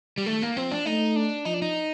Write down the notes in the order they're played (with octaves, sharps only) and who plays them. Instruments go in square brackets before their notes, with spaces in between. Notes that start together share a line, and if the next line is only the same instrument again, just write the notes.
[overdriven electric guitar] G3
[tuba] D#3 [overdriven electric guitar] A3
[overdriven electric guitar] A#3
[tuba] F3 [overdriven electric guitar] C4
[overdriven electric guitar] D4
[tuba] A3 [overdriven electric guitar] D#4
[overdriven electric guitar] D4
[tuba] F3 [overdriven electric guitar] D#4
[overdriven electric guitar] D4
D#4